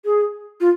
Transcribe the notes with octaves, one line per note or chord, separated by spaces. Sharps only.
G#4
F4